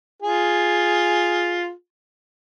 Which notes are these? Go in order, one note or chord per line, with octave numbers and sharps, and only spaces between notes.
F4 G#4